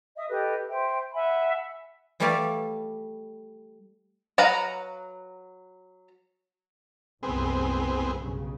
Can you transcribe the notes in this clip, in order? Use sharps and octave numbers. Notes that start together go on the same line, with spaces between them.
D#5 E5 D#6
G4 A4 B4 D#5
C5 E5 G5
E5 F#5 G#5 B5
E3 G3 A3 G4 D5 F5
F#3 B4 F5 F#5 A#5
F#1 C2 A2 B3 C4 G#4
B1 G2 C#3